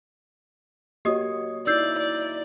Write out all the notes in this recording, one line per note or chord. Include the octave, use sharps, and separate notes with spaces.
A#3 F#4 G4 C#5 D#5 D#6
D#4 E4 D5 E6 G6 C7
D5